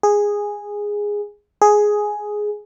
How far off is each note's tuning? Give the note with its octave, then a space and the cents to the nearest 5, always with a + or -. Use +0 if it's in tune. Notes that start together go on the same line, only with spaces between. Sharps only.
G#4 -10
G#4 +5